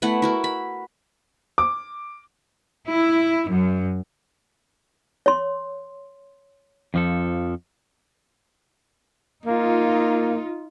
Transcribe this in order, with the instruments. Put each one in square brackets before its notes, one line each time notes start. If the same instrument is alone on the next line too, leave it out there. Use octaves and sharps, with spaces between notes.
[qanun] A3 B3 E4 F#5
E4 F#4 A#4
B5
[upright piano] D6
[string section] E4
F#2
[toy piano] C#5 C6
[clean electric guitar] F2 F3 A4
[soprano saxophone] A#3 [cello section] D#4 F4